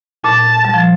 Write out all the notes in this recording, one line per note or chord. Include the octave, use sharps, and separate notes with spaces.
A#2 A5
G3
F3